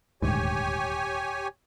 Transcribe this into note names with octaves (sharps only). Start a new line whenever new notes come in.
D#1 D2 G#2 G4 C#5 G#5